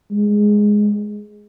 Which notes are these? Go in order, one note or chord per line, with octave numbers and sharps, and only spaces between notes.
G#3